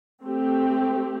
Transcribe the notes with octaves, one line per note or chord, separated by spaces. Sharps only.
A3 C4 G4